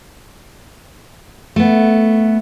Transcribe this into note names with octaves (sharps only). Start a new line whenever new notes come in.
A3 B3